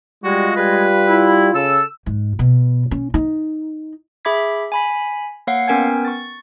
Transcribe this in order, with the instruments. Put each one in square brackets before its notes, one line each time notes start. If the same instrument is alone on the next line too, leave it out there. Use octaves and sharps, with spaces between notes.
[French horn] G3 [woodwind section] G#3 [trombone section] F4 [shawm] F#4
[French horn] G3 [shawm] B4
[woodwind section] E4
[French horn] C#3 [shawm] A4 [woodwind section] E6
[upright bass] G#2
B2
C#4
D#4
[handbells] G#4 E5 B5 D6 G#6 B6
G#5 B5 B6
A#3 C#5 F5 F#5 C7
B3 C#4 A#4 G5 G#5 G#6
C#6 A6